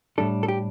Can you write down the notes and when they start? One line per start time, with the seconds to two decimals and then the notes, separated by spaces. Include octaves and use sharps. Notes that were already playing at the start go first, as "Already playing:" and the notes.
0.18 A2 G3 D4 A4
0.43 A4
0.48 G4